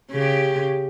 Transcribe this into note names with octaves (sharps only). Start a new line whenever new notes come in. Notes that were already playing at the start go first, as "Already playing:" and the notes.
C#3 G4